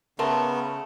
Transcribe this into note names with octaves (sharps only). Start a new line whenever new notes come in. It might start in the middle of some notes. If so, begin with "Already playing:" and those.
C#3 A3 B3 A#4 A5 C6